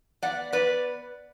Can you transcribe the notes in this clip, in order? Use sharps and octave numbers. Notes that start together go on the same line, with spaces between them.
B3 D5 F#5
B3 B4 D5